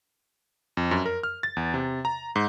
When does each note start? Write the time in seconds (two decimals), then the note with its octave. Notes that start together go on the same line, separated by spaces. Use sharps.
0.77 F2
0.91 F#2
1.06 A#4
1.23 F6
1.43 A6
1.57 E2
1.74 C3
2.05 A#5
2.36 G#2